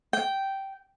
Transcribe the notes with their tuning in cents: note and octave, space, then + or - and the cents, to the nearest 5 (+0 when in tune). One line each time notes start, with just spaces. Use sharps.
G5 -10